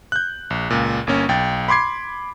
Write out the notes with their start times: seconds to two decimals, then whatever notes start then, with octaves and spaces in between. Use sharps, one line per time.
0.12 F#6 G6
0.50 A#1
0.70 C#2 A#2
1.07 G1 A#3 C#4
1.29 B1 G5 A6
1.68 B5 C6 D6 G#6 C7